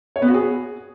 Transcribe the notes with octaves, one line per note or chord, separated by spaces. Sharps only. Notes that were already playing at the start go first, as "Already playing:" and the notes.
C#5
B3
F#4
G#4